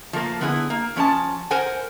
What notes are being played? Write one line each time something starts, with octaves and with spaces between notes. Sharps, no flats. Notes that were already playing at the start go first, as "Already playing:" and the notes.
F3 A3 A#3
D3 B3 E4 G#4
A#3
F3 C#4 D4 A5
A#4 C5 F#5 G#5